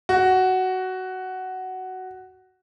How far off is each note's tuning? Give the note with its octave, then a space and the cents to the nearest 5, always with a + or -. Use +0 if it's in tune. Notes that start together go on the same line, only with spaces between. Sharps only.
F#4 +10